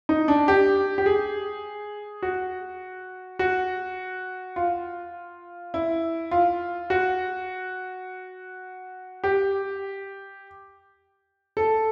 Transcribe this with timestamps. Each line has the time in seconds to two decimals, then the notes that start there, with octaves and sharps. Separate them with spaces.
0.09 D#4
0.28 D4
0.48 G4
0.98 G4
1.06 G#4
2.22 F#4
3.39 F#4
4.56 F4
5.74 E4
6.31 F4
6.90 F#4
9.24 G4
11.57 A4